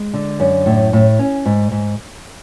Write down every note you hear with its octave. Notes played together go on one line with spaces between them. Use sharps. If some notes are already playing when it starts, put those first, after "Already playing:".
Already playing: G#3
D3
F#2
A2
A2
C#4
G#2
G#2